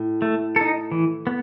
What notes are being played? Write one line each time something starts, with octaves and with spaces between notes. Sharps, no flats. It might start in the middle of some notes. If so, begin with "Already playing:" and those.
Already playing: A2
A3
D#4 A4
E3
B3